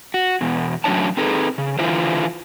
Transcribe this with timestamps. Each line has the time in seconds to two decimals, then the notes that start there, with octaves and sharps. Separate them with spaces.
0.14 F#4
0.41 E2 B2
0.84 A2 F#3 C#4 D4 C#5 A5
1.17 C4 D#4 G#4 A4 B4
1.58 C#3
1.79 D3 E3 E4 F4 C5